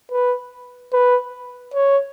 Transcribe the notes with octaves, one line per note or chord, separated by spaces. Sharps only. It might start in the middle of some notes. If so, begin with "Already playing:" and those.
B4
B4
C#5